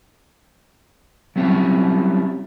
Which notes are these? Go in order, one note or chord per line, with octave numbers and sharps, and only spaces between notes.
F#3 G3 C4 C#4 E4